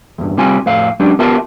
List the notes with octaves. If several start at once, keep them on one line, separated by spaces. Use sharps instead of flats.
E2 G2
C2 G3 C4 F4 G#5
F2 A2 F5
F#3 G#3 C#4 D4 G4
B3 F4 G4 A#4 E5 A5